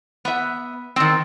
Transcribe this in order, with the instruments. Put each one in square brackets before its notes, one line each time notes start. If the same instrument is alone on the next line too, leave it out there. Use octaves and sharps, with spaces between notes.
[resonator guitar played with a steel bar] B3 E5
D#3 C4